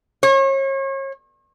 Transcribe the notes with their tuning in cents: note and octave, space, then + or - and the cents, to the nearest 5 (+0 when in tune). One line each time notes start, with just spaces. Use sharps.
C#5 -35